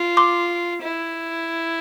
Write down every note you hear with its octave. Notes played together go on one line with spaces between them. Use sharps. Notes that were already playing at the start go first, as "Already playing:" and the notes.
Already playing: F4
C6 D6
E4